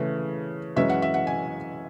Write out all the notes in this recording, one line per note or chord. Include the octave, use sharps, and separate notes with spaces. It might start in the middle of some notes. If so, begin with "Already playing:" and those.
Already playing: C#3 E3 A3
F#2 E3 G#3 C#4 E5
F#5
E5
F#5
G#5